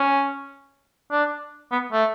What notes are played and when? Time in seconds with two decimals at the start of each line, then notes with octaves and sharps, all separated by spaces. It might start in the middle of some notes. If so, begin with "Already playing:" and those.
Already playing: C#4
1.11 D4
1.71 B3
1.92 A3